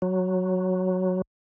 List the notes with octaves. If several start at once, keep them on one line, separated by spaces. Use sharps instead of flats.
F#3